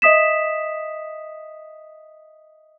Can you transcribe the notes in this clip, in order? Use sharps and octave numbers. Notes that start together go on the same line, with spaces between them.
D#5 E5 D#6 B6 E7